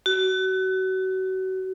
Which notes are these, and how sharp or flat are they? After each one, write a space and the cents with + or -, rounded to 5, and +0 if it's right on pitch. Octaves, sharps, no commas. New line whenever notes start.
F#4 +30